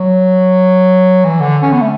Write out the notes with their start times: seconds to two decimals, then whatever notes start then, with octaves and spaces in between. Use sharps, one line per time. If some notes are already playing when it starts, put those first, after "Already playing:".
Already playing: F#3
1.25 E3
1.40 D3
1.62 C#4
1.72 B3
1.81 A3